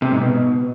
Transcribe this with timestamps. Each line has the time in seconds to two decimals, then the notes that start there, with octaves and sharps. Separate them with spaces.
0.02 C3
0.12 G#2
0.21 B2